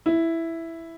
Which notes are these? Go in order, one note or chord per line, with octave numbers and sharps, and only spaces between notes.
E4